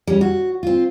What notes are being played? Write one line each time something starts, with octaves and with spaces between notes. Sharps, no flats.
G3 C#4
F#4
C4 F4